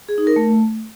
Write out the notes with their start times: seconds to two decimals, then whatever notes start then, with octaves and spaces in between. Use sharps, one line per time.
0.09 G#4
0.18 D#4
0.27 A#4
0.36 A3